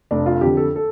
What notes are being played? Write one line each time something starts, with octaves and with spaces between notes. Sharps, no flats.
F1 D4
F4
F2 D3 G4
A4
A4